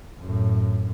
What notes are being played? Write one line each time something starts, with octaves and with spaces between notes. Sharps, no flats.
F#2 A2